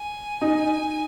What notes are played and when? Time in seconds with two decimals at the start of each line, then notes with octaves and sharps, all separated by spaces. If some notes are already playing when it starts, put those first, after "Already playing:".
Already playing: G#5
0.41 D#4